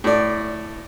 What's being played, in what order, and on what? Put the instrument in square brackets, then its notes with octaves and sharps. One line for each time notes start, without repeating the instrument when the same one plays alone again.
[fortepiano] A2 D5